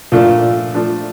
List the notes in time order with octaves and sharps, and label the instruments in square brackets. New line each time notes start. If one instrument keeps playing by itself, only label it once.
[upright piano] A#2 [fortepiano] F3 A3 D4
[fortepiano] F3 A3 D4